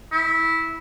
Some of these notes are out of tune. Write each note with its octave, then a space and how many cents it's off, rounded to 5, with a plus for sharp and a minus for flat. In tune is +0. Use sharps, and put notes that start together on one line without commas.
E4 -15